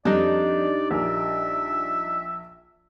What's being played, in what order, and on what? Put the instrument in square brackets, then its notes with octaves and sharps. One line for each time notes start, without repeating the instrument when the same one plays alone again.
[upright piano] F2 [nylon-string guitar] G3 [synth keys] D4 D#4 [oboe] D5
[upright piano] A#1 A#4 [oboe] E5